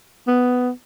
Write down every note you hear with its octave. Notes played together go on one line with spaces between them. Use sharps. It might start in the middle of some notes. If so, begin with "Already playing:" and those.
B3